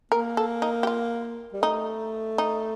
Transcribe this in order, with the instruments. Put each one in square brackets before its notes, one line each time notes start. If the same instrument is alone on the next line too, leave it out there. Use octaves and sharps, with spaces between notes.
[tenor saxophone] A#3 [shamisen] A#4
[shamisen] A4
D#4
G4
F4
[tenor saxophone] G3
[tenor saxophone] A3 [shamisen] D#4
[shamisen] D#4